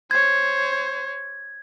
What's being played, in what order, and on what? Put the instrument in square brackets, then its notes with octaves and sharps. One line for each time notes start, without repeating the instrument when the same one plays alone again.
[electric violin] C5 C#5 [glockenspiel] G#6